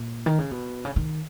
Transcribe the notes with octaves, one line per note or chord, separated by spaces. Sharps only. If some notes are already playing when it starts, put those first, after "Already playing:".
Already playing: A#2
D#3
C#3
B2
C#3
D#3